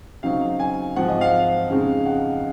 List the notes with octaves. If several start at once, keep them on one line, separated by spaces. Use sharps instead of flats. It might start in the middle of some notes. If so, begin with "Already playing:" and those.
C#3 F#3 C4 D#4 F5
G#5
G#2 F3 C4 F4 F#5
D#5
F5
F2 C#3 G#3 D#4
F#5